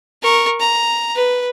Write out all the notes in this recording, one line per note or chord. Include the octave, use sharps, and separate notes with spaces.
A#4 C#6
A#5
B4